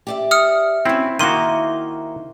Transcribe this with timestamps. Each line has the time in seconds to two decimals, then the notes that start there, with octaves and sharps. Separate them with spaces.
0.07 G4 D5 E5
0.31 D#6 F6 C#7
0.85 C4 C#4 E4 F#4
1.19 D#3 A#3 E4 F#4 C5 F5 C6 D#7